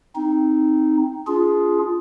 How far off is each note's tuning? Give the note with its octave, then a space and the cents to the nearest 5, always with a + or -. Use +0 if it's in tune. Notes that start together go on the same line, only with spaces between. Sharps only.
C4 +0 D#4 +0
D4 -45 F4 +0 G#4 +0